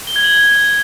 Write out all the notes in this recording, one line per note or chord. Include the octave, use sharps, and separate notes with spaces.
G7
G#6
F#7